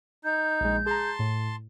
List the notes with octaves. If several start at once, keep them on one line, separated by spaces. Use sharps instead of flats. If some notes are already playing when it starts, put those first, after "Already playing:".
D#4 G6
A#1 G#3
G#4 A5 A#5 C6
A2